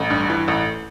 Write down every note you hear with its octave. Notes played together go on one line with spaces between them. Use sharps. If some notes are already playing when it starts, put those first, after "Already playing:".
Already playing: A1
G2
E3
A1